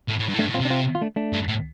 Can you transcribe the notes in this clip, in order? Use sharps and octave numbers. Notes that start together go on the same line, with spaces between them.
A2
A2
G2
A2
G2 A3 D4
A2
C4 F4
C3
D4
C4 F4
F4
A3 D4
A3 D4
G2
A2